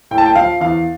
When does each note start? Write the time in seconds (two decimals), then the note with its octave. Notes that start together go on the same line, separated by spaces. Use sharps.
0.11 A2 G5
0.18 A5
0.26 G5
0.35 F3 F5
0.60 E2 F5